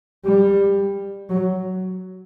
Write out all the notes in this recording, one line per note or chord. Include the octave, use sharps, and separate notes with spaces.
G3
F#3